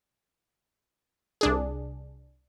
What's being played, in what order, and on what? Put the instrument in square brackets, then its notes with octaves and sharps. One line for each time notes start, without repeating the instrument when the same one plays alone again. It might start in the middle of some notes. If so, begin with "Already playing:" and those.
[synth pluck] C2 D4 G#4